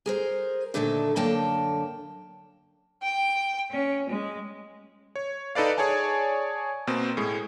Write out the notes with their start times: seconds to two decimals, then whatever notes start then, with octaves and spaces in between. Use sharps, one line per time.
0.06 G#4 A#4 C5
0.74 A#2 D3 D#3 A3 A4
1.16 F#2 D3 A#3 G5 A5
3.02 G5
3.72 C#4
4.09 G#3
5.16 C#5
5.55 D#4 A4 B4 D5 F5
5.78 G#4 C#5 D5 G#5 A5
6.87 B2 A#3 C4
7.17 A2 G#3